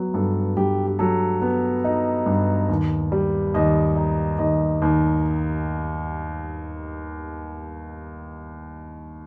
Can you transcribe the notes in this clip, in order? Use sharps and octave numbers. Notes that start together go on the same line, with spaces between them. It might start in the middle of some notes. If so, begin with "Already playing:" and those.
Already playing: F#3 B3
G2 A4
G2 G4
G4
F#3 A4
B3
D#4
G2
D#2
G3
D#2 D#5
D#4
D#2 D#5
D#2